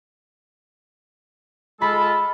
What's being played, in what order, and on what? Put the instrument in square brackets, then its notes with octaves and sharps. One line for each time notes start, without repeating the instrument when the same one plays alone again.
[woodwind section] G#3 F4 A4 [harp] B5